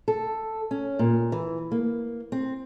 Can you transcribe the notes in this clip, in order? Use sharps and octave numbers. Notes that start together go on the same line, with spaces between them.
A4
C#4
A#2
E3
A#3
C4